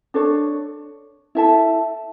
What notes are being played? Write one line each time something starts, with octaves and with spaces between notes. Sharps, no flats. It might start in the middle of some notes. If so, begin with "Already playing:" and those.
D4 A4 C#5
E4 A4 E5 A5